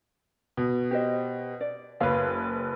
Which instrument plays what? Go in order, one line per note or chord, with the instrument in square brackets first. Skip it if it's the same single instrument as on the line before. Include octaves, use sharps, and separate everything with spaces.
[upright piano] B2
[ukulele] G4 C5 D#5
D5
[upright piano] F#1 B4 [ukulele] C#5 F5